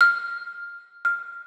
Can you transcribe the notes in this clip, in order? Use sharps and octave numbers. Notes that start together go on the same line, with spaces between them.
F6
F6